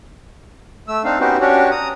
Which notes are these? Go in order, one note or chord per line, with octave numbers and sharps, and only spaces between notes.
A3 E6
C4 D4 D#4 F5
B3 C#4 D#4 F#4 G4 C5
C#4 D4 F#4 G4 C#5
A#5 D#6